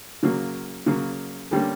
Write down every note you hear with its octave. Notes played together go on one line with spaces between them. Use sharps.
C#3 F#3 A#3
C#3 F#3 A#3
D3 G3 A#3 C#4